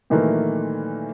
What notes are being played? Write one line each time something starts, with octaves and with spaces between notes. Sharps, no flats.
A#2 D#3 E3 F#3 A3 A#3